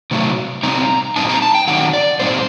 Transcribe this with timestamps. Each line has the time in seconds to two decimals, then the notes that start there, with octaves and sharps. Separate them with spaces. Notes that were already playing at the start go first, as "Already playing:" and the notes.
0.11 C3 D#3 F#3 A3
0.63 C3 G3 C4 D#4 A#5
1.16 A#2 G3 C4 D#4 A5
1.29 A#5
1.42 A5
1.55 G5
1.68 D#3 F#3 A3 D#4 F#5
1.93 D5
2.20 A#2 G3 C4 D#4 C5